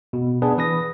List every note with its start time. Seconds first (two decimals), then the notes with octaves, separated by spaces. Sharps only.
0.13 B2
0.42 B3 D4 G#4 B4
0.57 E3 B4 D#6 A#6